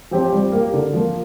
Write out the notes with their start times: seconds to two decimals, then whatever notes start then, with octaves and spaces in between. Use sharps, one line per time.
0.11 F3 C4 G4 C5
0.32 G3
0.52 A#3 G4
0.74 D3
0.93 F3 A#3